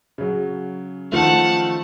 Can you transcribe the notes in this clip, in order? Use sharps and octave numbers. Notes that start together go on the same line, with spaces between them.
C#3 F#3
D#3 F3 A3 F#5 A5